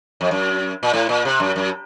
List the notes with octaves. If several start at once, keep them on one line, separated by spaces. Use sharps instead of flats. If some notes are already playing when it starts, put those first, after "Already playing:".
F2
F#2
A#2
A2
A#2
C3
F#2
F#2